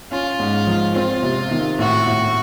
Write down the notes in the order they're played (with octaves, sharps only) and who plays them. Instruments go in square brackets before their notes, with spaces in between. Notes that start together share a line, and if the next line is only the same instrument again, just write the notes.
[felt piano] C#4 [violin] F4
[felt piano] G#2
F3
[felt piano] C4 [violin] F4
[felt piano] C3
D#3
[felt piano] A2 [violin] F#4
[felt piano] A2